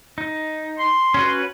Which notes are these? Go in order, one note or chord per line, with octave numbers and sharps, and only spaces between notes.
D#4
C6
C#4 F#4 B4